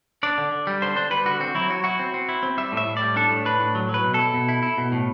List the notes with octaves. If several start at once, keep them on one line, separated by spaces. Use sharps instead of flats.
D4 D5
D3
D3
G3
D3 C5
D4 C5
G3 B4
D3 F#4
C4 F#4
F#3 E4
F#3 F#4
E4 F#4
C4
C4
E4
C4
G3 E5
A2 E5
A2
G3 D5
D4 A4
A2
D4 B4
A2
F#3
F#3 B4
B2
E4 A4
B2
E4
E4
B2
A2